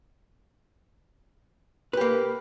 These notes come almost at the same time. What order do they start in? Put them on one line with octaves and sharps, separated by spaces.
B4 G4 A#3